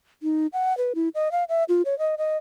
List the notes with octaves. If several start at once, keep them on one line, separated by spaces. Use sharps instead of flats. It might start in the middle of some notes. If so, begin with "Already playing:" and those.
D#4
F#5
B4
E4
D#5
F5
E5
F4
C#5
D#5
D#5